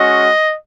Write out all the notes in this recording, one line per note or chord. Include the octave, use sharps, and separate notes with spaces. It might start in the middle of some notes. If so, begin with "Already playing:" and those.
Already playing: G#3 C#4 F#4 D#5